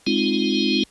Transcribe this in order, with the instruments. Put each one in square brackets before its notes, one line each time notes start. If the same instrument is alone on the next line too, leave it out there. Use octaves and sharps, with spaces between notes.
[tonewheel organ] G#3 C4 D#4 F4